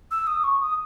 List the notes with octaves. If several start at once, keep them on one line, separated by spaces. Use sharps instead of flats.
E6
D#6
C#6
D#6